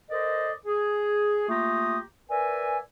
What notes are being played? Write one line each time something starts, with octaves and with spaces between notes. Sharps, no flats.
A4 A#4 C5 D5 D#5
G#4
A3 A#3 F4 G4 A#5 D#6
A#4 B4 D5 E5 G#5